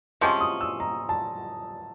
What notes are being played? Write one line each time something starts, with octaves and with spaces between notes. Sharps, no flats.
C3 F3 G#3 C#4 C6
D#6
E6
A#5
A5